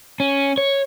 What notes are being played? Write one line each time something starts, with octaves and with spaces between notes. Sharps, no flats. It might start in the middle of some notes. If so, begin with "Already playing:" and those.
C#4
C#5